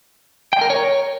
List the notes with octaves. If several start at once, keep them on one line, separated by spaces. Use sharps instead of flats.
G5
A#4
C#5